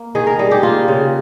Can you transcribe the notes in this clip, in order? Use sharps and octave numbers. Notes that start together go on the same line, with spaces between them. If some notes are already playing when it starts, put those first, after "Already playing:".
Already playing: A#3
D#3 G#4
A#4
G3 G#4
G4
A#3 F4
C#3